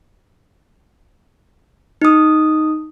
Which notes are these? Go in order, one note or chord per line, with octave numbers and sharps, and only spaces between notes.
D#4 D#6